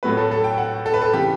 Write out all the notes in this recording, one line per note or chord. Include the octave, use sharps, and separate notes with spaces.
A2 F#3 A3 B4
A4
A4
G5
F#5
A4
B4
A4
C#3 E3 G4